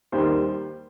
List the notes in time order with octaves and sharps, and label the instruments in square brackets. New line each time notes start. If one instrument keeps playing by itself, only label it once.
[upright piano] D#2 D#3 G3 C5